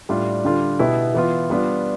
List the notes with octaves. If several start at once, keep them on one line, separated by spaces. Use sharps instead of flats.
A2 G3 D4 F4
D3 G3 D4 F4
B2 B3 E4 G4
E3 B3 F4
G3 B3 D4 F4